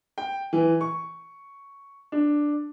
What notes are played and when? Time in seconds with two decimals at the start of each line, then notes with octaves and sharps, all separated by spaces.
0.18 G5
0.53 E3
0.81 C#6
2.12 D4